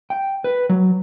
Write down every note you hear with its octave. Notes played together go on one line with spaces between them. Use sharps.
G5
B4
F#3